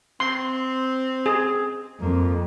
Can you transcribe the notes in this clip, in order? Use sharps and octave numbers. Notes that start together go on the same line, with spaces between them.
C4 C6
G#4
F2 A#3